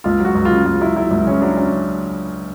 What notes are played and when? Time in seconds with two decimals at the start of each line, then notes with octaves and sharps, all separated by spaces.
0.04 C#2 F4
0.20 F#3
0.25 F#4
0.35 C#2
0.45 F4
0.51 C#3
0.65 C#2 F4
0.80 F#3 E4
0.96 F#3 E4
1.11 C#2
1.27 C#3 C#4
1.41 F#3 D4
1.57 C#4